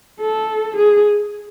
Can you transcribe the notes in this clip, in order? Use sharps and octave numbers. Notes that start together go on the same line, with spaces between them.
A4
G#4